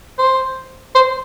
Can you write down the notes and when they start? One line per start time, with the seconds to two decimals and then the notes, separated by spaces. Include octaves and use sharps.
0.18 C5
0.95 C5